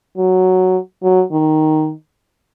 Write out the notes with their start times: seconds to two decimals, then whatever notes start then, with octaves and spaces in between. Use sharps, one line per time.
0.17 F#3
1.03 F#3
1.32 D#3